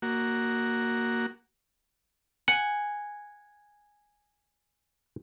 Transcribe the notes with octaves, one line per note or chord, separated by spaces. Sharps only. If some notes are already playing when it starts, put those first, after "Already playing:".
A#3 F#4
F#5 G#5